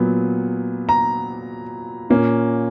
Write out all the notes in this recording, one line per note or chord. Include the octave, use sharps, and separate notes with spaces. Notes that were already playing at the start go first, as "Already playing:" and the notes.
Already playing: A#2 F#3 B3
A#5
A#2 A#3 C#4